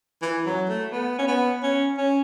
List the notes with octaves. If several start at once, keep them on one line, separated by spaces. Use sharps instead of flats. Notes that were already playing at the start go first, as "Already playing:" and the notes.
E3
F#3
A3
B3
C#4
B3
C#4
C#4